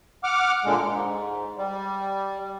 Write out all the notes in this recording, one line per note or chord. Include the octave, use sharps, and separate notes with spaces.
F#5 D6 F6
A#2 D3 G#3
G#2
G3